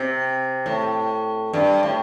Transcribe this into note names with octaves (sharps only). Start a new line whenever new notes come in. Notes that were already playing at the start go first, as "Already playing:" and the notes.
Already playing: C3
A2
G2
A2